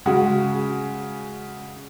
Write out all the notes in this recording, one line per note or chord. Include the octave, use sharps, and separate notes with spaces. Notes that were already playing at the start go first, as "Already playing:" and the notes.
C#3 G#3 F#4